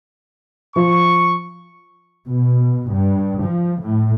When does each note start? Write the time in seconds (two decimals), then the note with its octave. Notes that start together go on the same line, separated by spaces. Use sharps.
0.76 F3 C#6
2.30 B2
2.91 G2
3.44 F3
3.83 A2